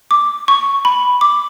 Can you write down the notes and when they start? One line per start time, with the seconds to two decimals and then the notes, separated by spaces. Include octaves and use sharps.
0.11 D6
0.48 C#6
0.85 B5
1.21 D6